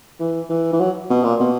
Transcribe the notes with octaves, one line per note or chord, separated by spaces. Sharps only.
E3
E3
E3
F#3
B2
A#2
B2